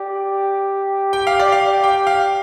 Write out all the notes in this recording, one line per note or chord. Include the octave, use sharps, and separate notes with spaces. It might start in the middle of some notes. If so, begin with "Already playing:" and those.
Already playing: G4 D5
G5
F5
D5
F5
G5
F5